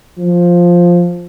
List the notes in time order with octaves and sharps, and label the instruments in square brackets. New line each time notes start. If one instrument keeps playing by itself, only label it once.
[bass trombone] F3